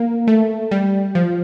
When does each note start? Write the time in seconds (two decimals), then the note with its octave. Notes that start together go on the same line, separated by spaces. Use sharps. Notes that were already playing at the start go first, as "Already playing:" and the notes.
Already playing: A#3
0.27 A3
0.71 G3
1.15 F3